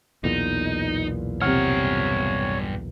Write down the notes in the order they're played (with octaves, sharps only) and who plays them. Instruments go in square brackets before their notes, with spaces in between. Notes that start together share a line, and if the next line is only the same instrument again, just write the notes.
[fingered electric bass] B1 E2 A#2 [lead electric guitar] D#4
[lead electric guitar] G2 F#5 [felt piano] C3 F6 [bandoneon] C#5